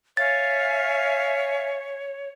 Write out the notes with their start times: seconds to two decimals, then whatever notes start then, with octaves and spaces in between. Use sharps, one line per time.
0.17 C#5 E5 F5 G#5 A6